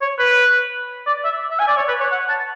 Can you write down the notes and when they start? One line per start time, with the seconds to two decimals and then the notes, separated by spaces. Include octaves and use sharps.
0.02 C#5
0.19 B4
1.07 D5
1.25 E5
1.51 E5
1.59 G#5
1.68 D5
1.77 C#5
1.88 B4
2.00 C#5
2.12 F#5
2.29 A5